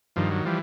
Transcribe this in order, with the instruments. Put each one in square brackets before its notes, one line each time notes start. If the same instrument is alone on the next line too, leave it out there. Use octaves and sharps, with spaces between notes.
[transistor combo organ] G2 D#3 F3
F#3
E3 F3 G3